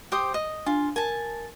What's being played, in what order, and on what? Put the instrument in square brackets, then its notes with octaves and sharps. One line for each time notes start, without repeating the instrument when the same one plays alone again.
[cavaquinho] G4 C5 D#6
D#5
[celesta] D4 G#5 [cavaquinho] F4
[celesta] A#4 [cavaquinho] G#5 A5